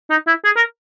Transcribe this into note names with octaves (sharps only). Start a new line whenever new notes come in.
D#4
E4
G#4
A#4